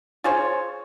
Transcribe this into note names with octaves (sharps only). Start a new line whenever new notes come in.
F4 G#4 C5 C#5